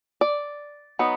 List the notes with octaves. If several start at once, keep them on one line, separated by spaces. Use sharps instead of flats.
D5
F#3 B3 D#4